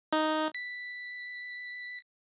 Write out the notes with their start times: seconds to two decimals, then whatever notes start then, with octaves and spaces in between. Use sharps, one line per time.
0.13 D#4
0.55 B6